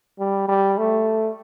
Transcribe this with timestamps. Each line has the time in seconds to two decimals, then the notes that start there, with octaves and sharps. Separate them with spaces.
0.19 G3
0.48 G3
0.78 A3